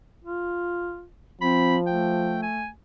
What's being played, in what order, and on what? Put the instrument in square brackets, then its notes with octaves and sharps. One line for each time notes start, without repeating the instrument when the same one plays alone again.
[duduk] F4
[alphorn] F3 [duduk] C4 [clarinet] B5
[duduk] A3 [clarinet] G5
[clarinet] G#5